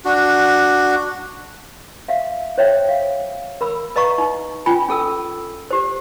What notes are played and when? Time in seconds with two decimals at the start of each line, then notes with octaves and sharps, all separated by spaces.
0.05 D4 F#4
2.08 E5 F5
2.58 C5 C#5 E5 G5
2.89 F5
3.61 A#4 B5 E6
3.96 B4 D#5 F5 A#5 C#6
4.18 D#4
4.66 C#4 F4 G5 G#5 B5
4.89 C#4 G#4 A4 E6
5.71 G4 C5